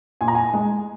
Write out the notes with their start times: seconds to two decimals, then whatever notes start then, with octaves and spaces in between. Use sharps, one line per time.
0.21 A#2 G#5
0.28 A#5
0.35 G#5
0.54 G#3